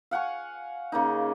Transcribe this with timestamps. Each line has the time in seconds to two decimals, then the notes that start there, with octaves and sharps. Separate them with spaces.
0.11 F5 F#5 G#5 C#6
0.92 C#3 A#3 D#4